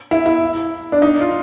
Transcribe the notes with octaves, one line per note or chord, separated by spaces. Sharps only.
E4
E4
D4
D#4
F4